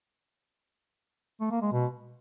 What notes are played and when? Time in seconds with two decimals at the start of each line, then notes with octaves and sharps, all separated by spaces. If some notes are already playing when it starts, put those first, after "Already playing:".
1.40 A3
1.51 A#3
1.62 G#3
1.72 B2